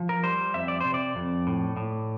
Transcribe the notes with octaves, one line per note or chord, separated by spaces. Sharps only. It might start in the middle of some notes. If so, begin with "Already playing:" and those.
Already playing: F3
A#4
G3 C5
F2 E5
D5
C3 C5
D5
F2
A2
A2